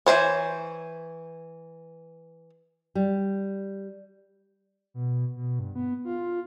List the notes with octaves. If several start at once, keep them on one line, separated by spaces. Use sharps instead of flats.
E3 A3 C5 C#5
G3
B2
B2
G2
B3
F4